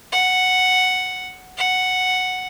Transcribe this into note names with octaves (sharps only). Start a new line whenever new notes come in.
F#5
F#5